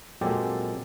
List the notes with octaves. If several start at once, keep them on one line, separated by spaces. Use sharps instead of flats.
A#2 F#3 G#3 C4 G4 A4